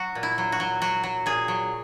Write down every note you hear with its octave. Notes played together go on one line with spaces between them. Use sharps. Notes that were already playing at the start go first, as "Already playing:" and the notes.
Already playing: F#3 F#4
A#2
E4
F#3
F#4
F#3
F#3 F#4
F#3
A#2 G#4
F#3